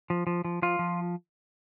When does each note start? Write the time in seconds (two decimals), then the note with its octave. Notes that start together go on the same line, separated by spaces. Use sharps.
0.10 F3
0.27 F3
0.45 F3
0.62 F3 F4
0.79 F3